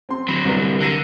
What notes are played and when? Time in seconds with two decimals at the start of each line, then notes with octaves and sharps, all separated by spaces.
0.09 C4 C6
0.28 D3 F#3 B5 A#6
0.45 C2 G3 B4
0.80 D3 A#4 A#6 D#7